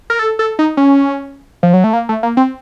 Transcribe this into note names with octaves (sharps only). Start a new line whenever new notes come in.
A#4
A4
A4
D#4
C#4
F3
F#3
A3
A#3
A3
A#3
C4